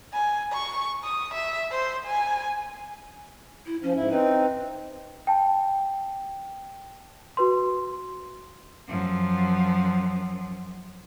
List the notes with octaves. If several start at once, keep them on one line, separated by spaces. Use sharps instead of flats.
G#5
C#6
D#6
E5
C5
G#5
E4
F3 C#4
G#2 E4
C4 D#4 B4
G5 A5
F#4 B4 C6
F#2 F3